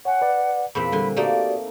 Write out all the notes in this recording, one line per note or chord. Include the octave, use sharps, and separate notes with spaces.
C#5 F#5 G#5
B4 D5
E2 A#2 C4 B5
D3 G3 G#5 C6
A3 A#3 D#4 F#4 G4 D5